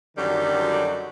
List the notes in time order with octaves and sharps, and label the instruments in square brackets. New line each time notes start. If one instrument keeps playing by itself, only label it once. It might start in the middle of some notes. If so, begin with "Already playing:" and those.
[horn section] F#2 D3 D#3 F#3 G3